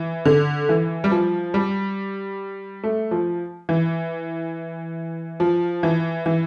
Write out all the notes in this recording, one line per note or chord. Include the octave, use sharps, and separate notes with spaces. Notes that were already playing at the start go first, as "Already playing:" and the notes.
Already playing: E3
D3
E3
G3
F3
G3
A3
F3
E3
F3
E3
E3